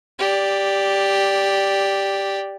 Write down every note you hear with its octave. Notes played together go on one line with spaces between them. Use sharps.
G4 D5